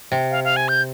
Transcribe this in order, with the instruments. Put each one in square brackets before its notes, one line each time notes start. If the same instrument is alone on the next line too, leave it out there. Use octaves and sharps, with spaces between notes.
[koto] C3
[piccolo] F5
F5
G#5
G6